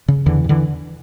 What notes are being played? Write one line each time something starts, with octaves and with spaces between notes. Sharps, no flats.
C#3
E2 D3 E3
C3
D3 E3